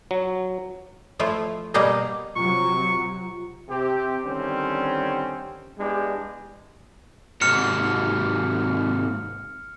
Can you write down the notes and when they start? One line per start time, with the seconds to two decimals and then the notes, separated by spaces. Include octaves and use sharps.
0.11 F#3
1.19 F3 A3 E4 F4
1.74 B2 G3 A#3 G4 G#4 D#5
2.36 C3 F#3 F4 A#5 C#6
3.69 C3 C4 G4
4.24 D3 D#3 G3 C4 C#4
5.78 G3 G#3 B3 D4 E4 G4
7.41 G#2 C3 F6 C#7